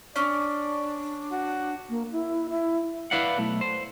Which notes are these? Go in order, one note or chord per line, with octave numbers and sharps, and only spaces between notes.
C#4 D4 D5
F#4
A#3
E4
E4
E4 B4 D5 F5 F#5
B1 A3
C5